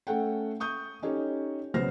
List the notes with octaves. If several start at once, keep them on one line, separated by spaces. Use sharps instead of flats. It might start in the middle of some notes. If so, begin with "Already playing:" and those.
A3 C#4 A4 F#5 G5
C#6 D#6 G6
C#4 D#4 G4 A4 C#5
B1 C#3 B3 C5 F6 A#6